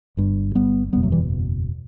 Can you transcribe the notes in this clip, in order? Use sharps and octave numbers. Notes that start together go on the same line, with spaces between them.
G1 G2
G3 B3
F#1 E2 B2 G3 B3
F#3 A3
E3 G3